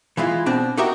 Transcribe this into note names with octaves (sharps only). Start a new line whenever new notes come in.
E3 G#3 E4 F4
B2 C4 D4
D#4 F#4 G4 A#4 E5